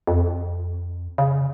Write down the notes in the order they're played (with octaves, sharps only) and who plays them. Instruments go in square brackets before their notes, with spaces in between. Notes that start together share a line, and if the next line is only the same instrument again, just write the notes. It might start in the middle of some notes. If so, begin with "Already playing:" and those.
[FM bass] F2
C#3